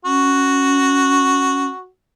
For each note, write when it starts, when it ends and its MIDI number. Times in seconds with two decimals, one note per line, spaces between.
0.05 1.66 61
0.05 1.87 66